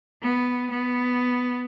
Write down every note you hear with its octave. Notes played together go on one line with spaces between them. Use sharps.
B3
B3